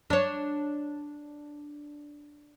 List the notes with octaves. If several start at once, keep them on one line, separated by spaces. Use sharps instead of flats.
D4 C#5